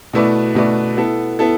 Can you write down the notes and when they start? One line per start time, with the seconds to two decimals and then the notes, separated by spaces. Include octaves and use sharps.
0.13 B2 A3 E4 B4 D5
0.55 B2 A3 E4 B4 D5
0.97 B3 E4 A4
1.39 B3 E4 A4